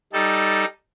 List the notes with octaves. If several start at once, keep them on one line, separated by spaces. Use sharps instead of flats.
G3 D#4 A4